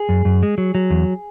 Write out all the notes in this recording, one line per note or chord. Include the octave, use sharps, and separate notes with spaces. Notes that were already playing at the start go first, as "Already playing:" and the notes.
Already playing: G#4
F#2
F#2
G#3
F#3
F#3
E2